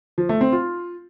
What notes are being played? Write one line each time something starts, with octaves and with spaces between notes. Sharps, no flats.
F3
A3
C4
F4